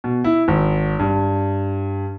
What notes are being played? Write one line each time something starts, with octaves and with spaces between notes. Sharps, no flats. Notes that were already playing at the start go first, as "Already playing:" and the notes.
B2
E4
G#1
G2